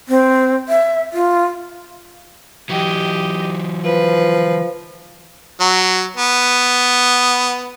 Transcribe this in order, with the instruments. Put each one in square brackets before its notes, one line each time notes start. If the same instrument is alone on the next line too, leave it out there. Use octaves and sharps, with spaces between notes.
[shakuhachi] C4
E5
F4
[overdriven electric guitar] E3 F#3 [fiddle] G4 D#5
[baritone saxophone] F3 [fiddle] B4
[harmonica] F#3
B3